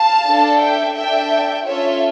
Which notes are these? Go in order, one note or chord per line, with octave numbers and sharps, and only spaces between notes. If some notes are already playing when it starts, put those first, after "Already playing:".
Already playing: F5 A5
D4 A4
E5 G5
D4 A4 E5 G5
C#4 F4 A4 C#5 E5